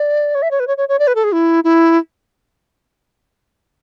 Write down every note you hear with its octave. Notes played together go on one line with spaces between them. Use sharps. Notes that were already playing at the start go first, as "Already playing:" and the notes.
Already playing: D5
C#5
E5
C#5
B4
C#5
C#5
C#5
D5
B4
A4
G#4
E4
E4